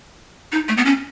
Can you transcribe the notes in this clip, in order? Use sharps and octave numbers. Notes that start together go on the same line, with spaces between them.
D#4
A3
B3
C#4